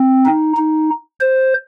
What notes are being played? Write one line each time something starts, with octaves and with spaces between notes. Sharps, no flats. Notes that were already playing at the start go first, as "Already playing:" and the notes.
Already playing: C4
D#4
D#4
C5